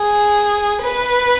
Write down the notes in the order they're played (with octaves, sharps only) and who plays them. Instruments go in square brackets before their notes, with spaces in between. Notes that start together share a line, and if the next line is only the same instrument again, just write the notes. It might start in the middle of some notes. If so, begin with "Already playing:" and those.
Already playing: [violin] G#4
B4